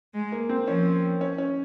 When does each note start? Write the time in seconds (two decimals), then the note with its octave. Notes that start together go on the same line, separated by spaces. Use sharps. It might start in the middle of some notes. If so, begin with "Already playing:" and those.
0.14 G#3
0.32 A#3
0.49 C4
0.68 F3 C#4
1.21 C#4
1.38 C#4